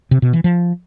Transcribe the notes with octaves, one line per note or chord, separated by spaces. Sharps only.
C3
B2
E3
F3